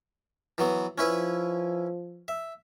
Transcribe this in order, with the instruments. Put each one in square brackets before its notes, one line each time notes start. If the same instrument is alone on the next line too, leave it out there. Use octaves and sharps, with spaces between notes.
[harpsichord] E3 F#3 B3
[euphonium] F3 [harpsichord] C#4 E4 B4
[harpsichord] E5